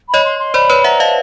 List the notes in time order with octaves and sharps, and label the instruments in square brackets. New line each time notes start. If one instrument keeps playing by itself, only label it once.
[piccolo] B5
[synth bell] C#5 D#5
[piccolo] C6
C6
[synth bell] C5 D5 [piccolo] B5
[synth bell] B4 C#5
[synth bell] E5 F#5 [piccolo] A#5
[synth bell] D#5 F5 [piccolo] A5